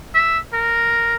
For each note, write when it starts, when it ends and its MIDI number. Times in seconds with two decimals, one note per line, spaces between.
0.14 0.38 76
0.53 1.16 70